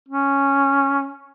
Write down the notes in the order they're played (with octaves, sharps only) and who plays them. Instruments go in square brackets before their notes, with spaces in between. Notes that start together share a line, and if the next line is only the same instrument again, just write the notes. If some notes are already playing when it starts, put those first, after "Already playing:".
[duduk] C#4